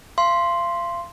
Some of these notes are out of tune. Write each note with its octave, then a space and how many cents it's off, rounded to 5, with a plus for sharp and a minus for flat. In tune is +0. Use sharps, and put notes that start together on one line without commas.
F5 -35 C6 +0